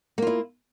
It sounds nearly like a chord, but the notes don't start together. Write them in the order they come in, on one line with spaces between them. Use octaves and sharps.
A#3 F4 E4